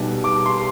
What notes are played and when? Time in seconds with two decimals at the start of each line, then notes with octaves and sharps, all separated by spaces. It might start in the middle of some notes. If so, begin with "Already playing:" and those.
Already playing: B1 B2 G3 B3
0.24 D6
0.46 C6